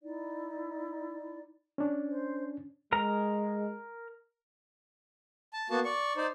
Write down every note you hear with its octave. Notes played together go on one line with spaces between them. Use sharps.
D#4 E4 D5
C#4 D4
C5
G#3 A#4 A#5
A5
A#3 B3 F#4 A5
D5 C#6
D#4 C5 D5